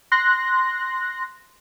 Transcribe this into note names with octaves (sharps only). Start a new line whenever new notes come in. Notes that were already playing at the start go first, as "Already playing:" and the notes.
C6 F#6 A#6